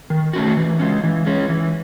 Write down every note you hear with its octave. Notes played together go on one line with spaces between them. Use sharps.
D#3
A3 C#4 F#4
E3
G#3 C#4
E3
G#3 C#4
E3